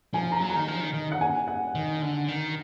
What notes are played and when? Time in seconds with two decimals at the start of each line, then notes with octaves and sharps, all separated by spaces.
0.14 F3 G#5
0.32 A#5
0.41 F#3
0.50 A#5
0.56 D#3
0.68 F3
0.80 D#3
0.94 D#3
1.12 F#5
1.21 G#5
1.48 F#5
1.75 D#3
2.02 D3
2.28 D#3